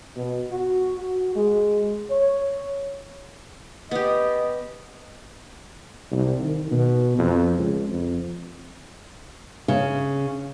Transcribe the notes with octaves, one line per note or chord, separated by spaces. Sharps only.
B2
F#4
F#4
G#3
C#5
B3 G4 D#5
C2
D#3
B2
F2
C#2
F2
C#3